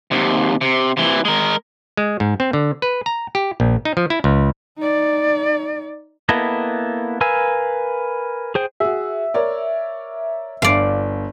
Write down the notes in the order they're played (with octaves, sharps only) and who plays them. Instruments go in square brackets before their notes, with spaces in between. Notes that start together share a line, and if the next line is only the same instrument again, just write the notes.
[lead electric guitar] D#2 C3
C3
C3 E3
G#3 A#4
[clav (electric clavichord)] G#3
G#2
C4
D3
B4
A#5
G4
A#1
D#4
F3
E4
C#2
[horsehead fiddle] D#4 D5
[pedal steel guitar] A#3 B3 E4 A4 D#5
A#4 B4 F5 G#5 E6
G#4 C5 G5
[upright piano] F#4 G#4 [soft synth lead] E5
[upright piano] A#4 C#5 D5
[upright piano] G1 [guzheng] D5 F5